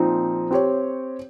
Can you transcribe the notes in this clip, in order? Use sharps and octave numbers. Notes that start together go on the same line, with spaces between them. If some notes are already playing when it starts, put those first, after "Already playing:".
Already playing: A#2 F3 C4 D#4
C4 G4 C#5